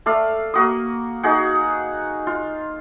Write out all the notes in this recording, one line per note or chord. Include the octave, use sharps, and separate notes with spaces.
A3 D5 F5
A#3 F#4 D#6
D#4 F#4 G#4 F#5
F4